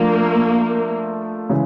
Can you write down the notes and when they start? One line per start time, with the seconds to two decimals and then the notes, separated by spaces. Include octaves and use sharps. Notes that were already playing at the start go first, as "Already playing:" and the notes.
Already playing: F3 A3 A#3 D4 F4
1.50 C#3 E3 G#3